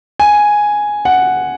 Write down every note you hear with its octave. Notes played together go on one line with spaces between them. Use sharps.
G#5
F#5